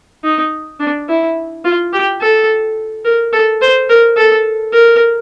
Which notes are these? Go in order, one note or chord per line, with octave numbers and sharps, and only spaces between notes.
D#4
D4
E4
F4
G4
A4
A#4
A4
C5
A#4
A4
A#4